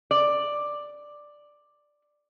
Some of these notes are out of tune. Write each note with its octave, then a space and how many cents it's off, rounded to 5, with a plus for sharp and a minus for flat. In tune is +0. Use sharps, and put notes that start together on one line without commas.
D5 +5